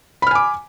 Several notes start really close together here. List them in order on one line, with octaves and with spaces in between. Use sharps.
B5 F6 G#5 D6